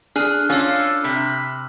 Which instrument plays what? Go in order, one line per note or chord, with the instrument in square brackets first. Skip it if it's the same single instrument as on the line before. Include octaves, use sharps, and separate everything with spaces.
[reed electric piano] D4 [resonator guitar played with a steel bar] G#4 [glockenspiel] F6 F#6
[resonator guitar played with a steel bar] C#4 F4 [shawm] A4 [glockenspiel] D6 E6
[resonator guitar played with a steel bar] C3 [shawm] B5